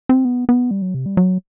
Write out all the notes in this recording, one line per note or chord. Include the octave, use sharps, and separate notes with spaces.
C4
B3
B3
G3
F#3
C3
G3
F#3